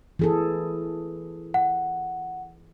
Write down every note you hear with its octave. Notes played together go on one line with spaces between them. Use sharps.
E3 G#4 A4
F#5